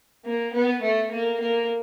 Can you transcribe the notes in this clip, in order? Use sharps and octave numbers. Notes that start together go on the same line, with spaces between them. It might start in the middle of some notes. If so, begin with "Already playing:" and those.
A#3
B3
A3
A#3
A#3